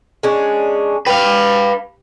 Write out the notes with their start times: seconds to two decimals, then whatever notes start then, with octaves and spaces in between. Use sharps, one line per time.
0.23 G#3 C#4 D4
1.06 G4 B4 F5